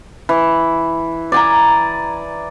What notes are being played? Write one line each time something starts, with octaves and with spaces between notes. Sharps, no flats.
E3
D5 G#5 A#5